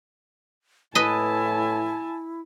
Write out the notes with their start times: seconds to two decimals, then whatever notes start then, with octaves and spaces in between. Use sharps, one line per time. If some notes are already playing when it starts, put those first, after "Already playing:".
0.95 A2 E4 B4 D#5 G#5 A5